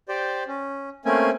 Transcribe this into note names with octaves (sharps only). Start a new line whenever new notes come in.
G4 C5 D5
C#4
A3 A#3 C4 C#4 G#5